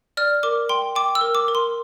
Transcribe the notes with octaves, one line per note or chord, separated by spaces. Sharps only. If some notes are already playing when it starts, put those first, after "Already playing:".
D5 F6
A#4 D6
G5 C6
G5 D6
E6
A#4
D6
A#4
C6